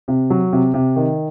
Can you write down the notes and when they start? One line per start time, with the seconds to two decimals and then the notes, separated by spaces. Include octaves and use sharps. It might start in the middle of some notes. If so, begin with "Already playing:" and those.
0.08 C3
0.30 F#3
0.52 C3
0.74 C3
0.96 D#3